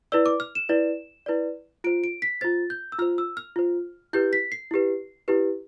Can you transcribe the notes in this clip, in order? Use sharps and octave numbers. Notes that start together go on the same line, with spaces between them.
E4 B4 D5 E6
D6
F6
E7
E4 B4 D5
E4 B4 D5
F4 C5 D7
D7
B6
F4 C5 A6
G6
E6
F4 C5 F6
E6
F6
F4 C5
E4 G4 B4 G6
B6
C7
E4 G4 B4
E4 G4 B4